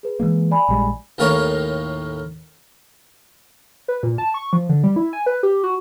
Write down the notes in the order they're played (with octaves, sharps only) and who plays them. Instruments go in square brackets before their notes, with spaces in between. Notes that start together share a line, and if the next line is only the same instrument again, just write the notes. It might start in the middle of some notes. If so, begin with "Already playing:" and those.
[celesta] G#4 B4
[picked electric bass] E3 G#3 A#3
[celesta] D5 G#5 B5
[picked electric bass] A#1 G3 G#3
[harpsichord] D#2 A2 F4 A#4 C#5 G#5
[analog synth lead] B4
A#2
A5
C#6
F3
D3
G3
E4
G#5
B4
G4
F#4